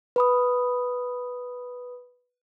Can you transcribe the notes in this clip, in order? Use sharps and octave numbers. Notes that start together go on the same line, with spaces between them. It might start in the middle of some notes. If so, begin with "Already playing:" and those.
B4 B5 D#6